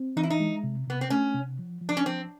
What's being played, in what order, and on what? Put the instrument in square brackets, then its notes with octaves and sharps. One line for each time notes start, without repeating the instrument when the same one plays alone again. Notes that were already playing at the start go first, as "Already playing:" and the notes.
Already playing: [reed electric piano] C4
[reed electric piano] E3 [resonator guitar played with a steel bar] D#4
[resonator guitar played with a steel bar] E4
D#4
[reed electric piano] G#3
C3
[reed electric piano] C3 [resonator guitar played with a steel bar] B3
[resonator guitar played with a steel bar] C4
[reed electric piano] A3 [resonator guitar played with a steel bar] C#4
[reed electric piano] C3
F3
F3
[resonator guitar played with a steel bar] D4
C#4
[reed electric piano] F3 [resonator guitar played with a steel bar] C4